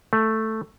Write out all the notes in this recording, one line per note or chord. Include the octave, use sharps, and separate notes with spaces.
A3